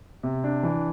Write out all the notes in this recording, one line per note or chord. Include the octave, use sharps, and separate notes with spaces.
C3
D4
E3